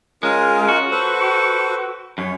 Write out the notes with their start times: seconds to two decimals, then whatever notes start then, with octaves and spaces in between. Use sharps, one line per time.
0.23 G#3 C#4 F4 A#4
0.68 F#4
0.91 A4 B4 C5
2.18 F#2 C#5